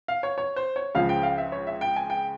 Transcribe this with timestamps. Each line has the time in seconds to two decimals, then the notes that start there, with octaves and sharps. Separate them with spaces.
0.08 F5
0.23 C#5
0.38 C#5
0.56 C5
0.76 C#5
0.95 C#2 C#3 F3 F5
1.09 G5
1.23 F5
1.38 E5
1.52 C#5
1.67 E5
1.81 G5
1.96 G#5
2.10 G5